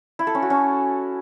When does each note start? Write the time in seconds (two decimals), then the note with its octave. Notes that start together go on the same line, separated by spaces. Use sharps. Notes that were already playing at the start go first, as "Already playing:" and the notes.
0.19 E4
0.27 A4
0.35 C#4
0.42 F#4
0.50 C#4